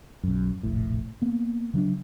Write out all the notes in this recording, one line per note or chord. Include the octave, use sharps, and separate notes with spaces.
B1 F#2
F1 A#1 A2
A#3 B3
C#3 F#3 C4 D4